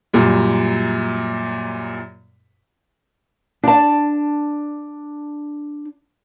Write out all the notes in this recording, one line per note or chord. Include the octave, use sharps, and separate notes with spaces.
F#2 A#2 G3
D4 A5